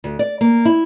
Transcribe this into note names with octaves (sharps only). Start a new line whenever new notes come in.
D2
D5
A#3
E4